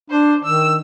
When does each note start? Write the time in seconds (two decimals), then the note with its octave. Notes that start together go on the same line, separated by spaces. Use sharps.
0.10 D4 C5
0.44 D#3 E6